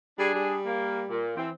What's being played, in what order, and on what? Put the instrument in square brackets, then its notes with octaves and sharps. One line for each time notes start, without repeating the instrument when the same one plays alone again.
[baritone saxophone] G3 [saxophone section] D4 G#4
[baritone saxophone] G3
[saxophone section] A#3
A#2
[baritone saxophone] E3 [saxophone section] C4